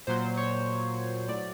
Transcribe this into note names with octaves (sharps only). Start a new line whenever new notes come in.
A#2 F#3 C5
C#5
A2 F#3 D5